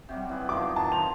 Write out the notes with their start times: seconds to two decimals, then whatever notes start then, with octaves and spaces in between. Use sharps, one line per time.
0.09 C3 F#3 G3
0.29 E3 B3 E4
0.49 D#3 F3 F#3 D6
0.76 D#3 A5
0.92 C5 F7